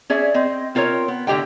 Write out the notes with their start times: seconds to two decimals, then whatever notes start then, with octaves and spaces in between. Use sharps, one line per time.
0.10 C#4 G#4 D5 E5
0.34 C4 D#5
0.75 C4 F4 A#4 C5 C#5
1.08 B3
1.27 A2 D3 G4 D#5 G5